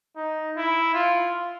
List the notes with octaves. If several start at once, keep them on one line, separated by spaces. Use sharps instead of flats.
D#4
E4
F4